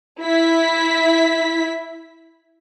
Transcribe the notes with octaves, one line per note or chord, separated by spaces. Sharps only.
E4 B6